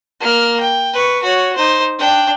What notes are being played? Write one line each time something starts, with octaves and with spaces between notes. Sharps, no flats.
A#3 F6
G5
B4 C#6
F#4 C#5
D#4 C5
D4 G5